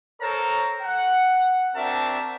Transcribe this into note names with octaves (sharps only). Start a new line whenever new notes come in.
A4 A#4 C5 C#5 A5 A#5
F#5
C4 D4 F#4 A#4 E5 A5